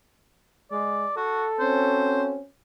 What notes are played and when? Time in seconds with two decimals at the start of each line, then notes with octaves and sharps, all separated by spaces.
0.72 G#3 D5
1.17 F#4 A4
1.60 C4 C#4 F#4 C5